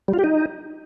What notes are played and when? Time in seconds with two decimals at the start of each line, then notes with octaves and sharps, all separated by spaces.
0.08 G3
0.13 F4
0.19 G4
0.24 D#4